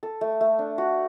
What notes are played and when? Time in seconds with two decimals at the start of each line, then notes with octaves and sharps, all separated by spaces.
0.03 A4
0.21 A3
0.41 A3
0.59 D4
0.78 F#4